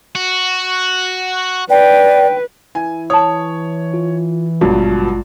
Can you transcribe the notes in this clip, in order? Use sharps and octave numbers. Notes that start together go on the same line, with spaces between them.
F#4
B4 D5 G5
E3 G#5
C#5 A5 D#6
F4
G#1 G2 B2 F#3 G#3 F4